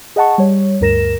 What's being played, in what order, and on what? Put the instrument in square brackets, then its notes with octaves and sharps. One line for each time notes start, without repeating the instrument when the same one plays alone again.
[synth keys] G#4 D#5 F#5 A5 C#6
G3 C#5
D2 G2 A#4 A#6 E7